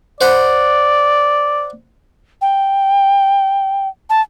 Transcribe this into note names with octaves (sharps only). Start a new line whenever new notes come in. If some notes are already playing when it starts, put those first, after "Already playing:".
C5 D5 F#5 B5
G5
A5